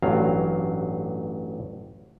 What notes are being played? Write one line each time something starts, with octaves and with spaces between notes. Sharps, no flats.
A1 G2 F#3 F5